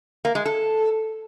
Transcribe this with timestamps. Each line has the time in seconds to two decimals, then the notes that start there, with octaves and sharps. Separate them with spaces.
0.25 A#3
0.35 G#3
0.45 A4